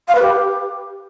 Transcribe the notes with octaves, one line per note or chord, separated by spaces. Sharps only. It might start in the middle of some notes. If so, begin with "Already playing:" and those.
F5
B4
G4